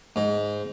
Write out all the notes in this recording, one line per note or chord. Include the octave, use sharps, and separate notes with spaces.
G#2